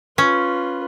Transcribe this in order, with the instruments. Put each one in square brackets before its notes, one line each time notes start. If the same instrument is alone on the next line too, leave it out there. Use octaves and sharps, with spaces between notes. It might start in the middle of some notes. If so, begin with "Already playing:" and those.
[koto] C#4 [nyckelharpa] F4 B4